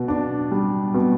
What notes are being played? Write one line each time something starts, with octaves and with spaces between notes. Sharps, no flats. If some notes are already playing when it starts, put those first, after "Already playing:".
Already playing: B2
D4
G3
B2